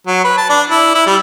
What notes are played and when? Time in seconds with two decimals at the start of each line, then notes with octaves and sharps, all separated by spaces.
0.07 F#3
0.24 B4
0.37 A5
0.50 D4
0.70 E4
0.95 E4
1.07 G3